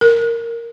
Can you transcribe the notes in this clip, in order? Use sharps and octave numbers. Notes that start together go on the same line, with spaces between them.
A#4